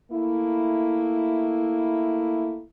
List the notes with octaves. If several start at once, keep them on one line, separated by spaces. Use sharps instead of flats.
A3 A#3 E4